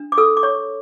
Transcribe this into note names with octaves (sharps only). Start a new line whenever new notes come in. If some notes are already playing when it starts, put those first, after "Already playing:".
Already playing: D4
D6
A4 E6
D6
C#5 C#6